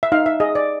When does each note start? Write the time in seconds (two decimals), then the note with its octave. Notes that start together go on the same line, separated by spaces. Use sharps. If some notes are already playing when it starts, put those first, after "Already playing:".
0.03 E5
0.12 D#4 F5
0.26 E5
0.40 G#4 D#5
0.55 D5